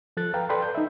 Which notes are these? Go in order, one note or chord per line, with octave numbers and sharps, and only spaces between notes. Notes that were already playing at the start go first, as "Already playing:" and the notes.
F3 A4 F#6 A6
B4 F5 G5 A#5
A4 B4 D5 G5 B5 C6
G6
D#4 E5